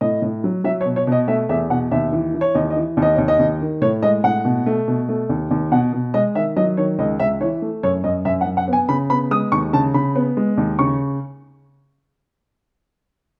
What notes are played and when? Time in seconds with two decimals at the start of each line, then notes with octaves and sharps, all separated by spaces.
0.01 A2 D#5
0.22 A2
0.44 F#3
0.64 F#3 E5
0.81 C#5
0.86 B2
0.96 C#5
1.07 B2 D#5
1.28 A3 E5
1.49 E2 E5
1.70 B2 F#5
1.91 D#2 E5
2.12 E3
2.34 E3
2.41 C#5
2.55 D#2 D#5
2.70 D#5
2.76 E3
2.97 D#2
3.02 D#5
3.15 D#2 C#5
3.28 D#5
3.39 D#2
3.61 D#3
3.82 A2 C#5
4.02 G#3 D#5
4.24 A2 F#5
4.45 B2
4.66 A3
4.88 B2
5.09 A3
5.29 D#2
5.51 D#2
5.72 B2 F#5
5.93 B2
6.14 G#3 D#5
6.35 D#3 E5
6.56 F#3 D#5
6.77 D#3 C#5
6.99 C#2 D#5
7.19 C#2 E5
7.41 E3 C#5
7.62 A3
7.83 F#2 C#5
8.04 F#2 D#5
8.25 F#2 E5
8.41 F#5
8.46 F#2
8.57 F#5
8.68 B3
8.73 G#5
8.88 C#3 B5
9.10 B3 B5
9.31 G#3 D#6
9.52 D#2 C#6
9.73 C#3 A5
9.94 C#3 B5
10.15 B3
10.37 G#3
10.58 D#2
10.79 C#3 C#6